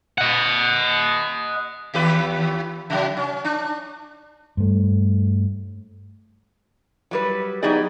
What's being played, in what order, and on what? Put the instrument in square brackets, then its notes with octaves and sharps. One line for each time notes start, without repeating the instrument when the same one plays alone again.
[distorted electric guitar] D#5 F#5
[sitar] D#2 G4 B4
C3 F#3
C#4
D4
[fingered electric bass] G2 A3
[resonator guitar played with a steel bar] F#3 G3 B4
F#3 B3 D#4 G4 G#4 D5